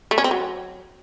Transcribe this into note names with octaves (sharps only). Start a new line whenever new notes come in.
A3
C#4
C4
F#3